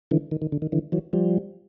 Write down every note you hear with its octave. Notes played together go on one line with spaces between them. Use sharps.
D3 E3
D#3
D#3
D3
D#3
D3 E3
E3 F#3
F3 G3